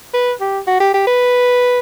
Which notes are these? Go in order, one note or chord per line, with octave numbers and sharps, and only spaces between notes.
B4
G4
F#4
G4
G4
B4